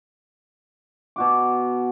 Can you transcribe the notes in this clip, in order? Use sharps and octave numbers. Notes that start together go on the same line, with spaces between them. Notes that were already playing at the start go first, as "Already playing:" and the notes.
B2 F#4 D6